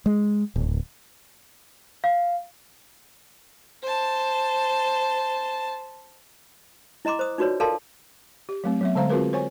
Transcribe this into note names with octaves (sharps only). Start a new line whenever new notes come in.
G#3
D1
F5
C5 A5
E4 D#5 A#5 C6 D6
C5 D#6
D#4 F4 F#4 B4 C#5 D5
A4 A#4 D5 F5 A5 C6
G4
F#3 A3 C4
F#3 B3 E5
D3 G#3 C5 F5 A#5
C4 F4 F#4 G#4 A#4 B4
C5 C#5 G#5 C#6